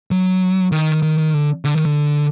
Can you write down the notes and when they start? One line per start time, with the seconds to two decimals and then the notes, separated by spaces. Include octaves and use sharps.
0.11 F#3
0.72 D#3
1.03 D#3
1.18 D#3
1.34 D3
1.65 D3
1.75 D#3
1.85 D3